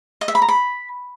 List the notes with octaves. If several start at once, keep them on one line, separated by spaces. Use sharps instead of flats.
D#5
E5
B5
A#5
B5